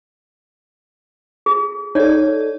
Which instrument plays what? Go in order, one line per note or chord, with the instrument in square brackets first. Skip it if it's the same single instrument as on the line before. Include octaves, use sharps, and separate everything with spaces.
[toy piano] G#4
[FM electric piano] D#4 A4 [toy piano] C#5 D5